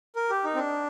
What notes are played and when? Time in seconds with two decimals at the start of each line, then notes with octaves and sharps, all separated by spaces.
0.16 A#4
0.30 G4
0.44 D#4
0.55 C4
0.58 D4